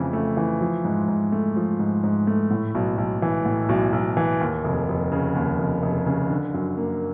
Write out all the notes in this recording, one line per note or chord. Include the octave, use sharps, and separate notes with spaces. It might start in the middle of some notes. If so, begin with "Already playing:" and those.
Already playing: F2 C#3 E3 A3
A3
E3
F3
G#2
G#2
A3
F3
G#2
G#2
A3
A2
B1
B1
E3
A2
B1
B1
E3
D#2
F1
F1
C#3
D#2
F1
F1
C#3
D3
F#2
A#3